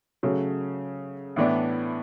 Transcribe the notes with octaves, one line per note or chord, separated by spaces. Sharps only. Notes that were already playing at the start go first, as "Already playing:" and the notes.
C#3 F#3 A3 C#4
A2 E3 B3 D4